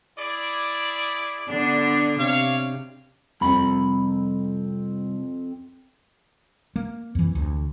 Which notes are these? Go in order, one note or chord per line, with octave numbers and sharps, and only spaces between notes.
E4 G#4 D5
D3 B3 D4
C3 C#5 F5
C2 F2 C4 B5
A#3
F2 E3
D2